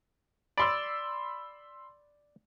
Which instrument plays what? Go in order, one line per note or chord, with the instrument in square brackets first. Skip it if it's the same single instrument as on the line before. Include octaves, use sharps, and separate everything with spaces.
[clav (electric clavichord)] D5 [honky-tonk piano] B5 C6 E6